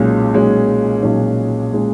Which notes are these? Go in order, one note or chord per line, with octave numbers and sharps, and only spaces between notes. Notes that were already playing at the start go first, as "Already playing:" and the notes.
Already playing: B1 A#2 G#3 C#4
B1 A#2 G#3 C#4
B1 A#2 G#3 C#4
A#2 G#3 C#4